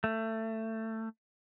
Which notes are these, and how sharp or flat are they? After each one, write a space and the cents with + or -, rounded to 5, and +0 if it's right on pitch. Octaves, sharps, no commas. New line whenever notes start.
A3 +20